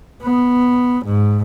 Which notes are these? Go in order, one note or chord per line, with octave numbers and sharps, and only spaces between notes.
B3
G#2